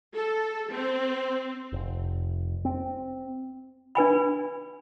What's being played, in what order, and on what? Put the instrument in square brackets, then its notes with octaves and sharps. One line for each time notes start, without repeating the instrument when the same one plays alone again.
[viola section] A4
C4
[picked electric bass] F1
C4
[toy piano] D4 B4 G#5 B5